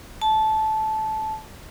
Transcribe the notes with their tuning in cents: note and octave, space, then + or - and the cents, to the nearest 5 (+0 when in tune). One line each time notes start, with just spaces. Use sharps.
A5 -15